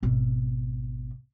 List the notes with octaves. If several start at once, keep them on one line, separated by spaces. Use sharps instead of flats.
G#1 B2